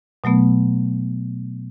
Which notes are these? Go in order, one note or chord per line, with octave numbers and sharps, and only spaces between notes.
B2 F#3 A3 B3